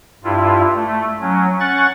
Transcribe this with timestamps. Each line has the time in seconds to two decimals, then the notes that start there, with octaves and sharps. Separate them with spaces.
0.24 G2 E4 F4
0.75 A3
1.21 F#3 C#4
1.60 C#4 F#5 C#6 F#6 A6